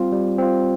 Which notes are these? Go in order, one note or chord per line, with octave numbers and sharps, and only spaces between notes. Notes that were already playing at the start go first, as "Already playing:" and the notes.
Already playing: G3 C4 F4
G3
C4 F4